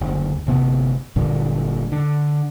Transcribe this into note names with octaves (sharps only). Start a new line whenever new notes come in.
F#1 D2
G1 C3 B3
G1 G2 A#2 D3
D3